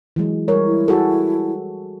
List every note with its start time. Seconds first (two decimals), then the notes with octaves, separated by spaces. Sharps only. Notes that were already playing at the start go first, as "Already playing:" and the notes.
0.16 E3 F#3 G#3
0.48 G3 A#4 C#5
0.66 E4
0.88 F#4 G#4 A4